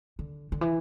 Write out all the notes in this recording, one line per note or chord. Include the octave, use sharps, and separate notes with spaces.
D3
D3
E3